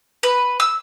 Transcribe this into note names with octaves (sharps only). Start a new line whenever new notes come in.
B4
E6